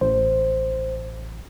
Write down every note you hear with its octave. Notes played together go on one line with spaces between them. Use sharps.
A1 C5